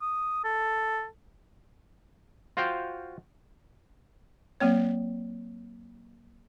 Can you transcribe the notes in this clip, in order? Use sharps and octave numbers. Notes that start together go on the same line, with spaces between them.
D#6
A4
F4 F#4 C5 F5 G5
F#3 A#3 C4 C#5